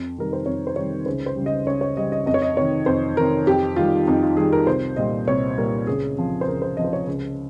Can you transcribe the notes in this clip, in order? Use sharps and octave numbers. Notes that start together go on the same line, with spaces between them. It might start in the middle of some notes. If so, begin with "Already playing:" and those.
Already playing: F2
C3 D#3 G3 A#4
C5
F2 C#5
C5
C3 D#3 G3 C#5
C#2 C5
C5
C#3 G3
D#5
C#2 C#5
C#5
C#3 G3 D#5
D#5
F2 D#5
C#5
D#5
C3 D#3 C#5
F2 C5
C3 D#3 A#4
F2 G4
D#3 G3 F4
F2 D#4
F4
D#3 G3 G#4
A#4
C2 C5
A#2 G3 D#5
C2 C#5
A#2 G3 A#4
C#2 G#4
C3 F3
C5
C#2 A#4
C5
C3 F3 D#5
C5
C#5
C#2